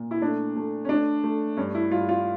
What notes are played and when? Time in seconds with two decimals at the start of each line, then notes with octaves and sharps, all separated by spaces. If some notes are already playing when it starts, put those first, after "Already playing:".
Already playing: A#2
0.11 E4
0.21 A3 D4
0.56 A3
0.85 C#4
0.89 A3 D4
1.24 A3
1.57 G2 C#4
1.75 E4
1.91 G2 F4
2.09 F4